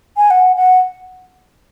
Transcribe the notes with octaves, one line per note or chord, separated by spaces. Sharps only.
G#5
F#5
F#5